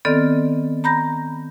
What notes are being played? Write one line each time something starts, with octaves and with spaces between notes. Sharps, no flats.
D#3 B3 C4 A4 D5 F6
A#5 B5 G6 A#6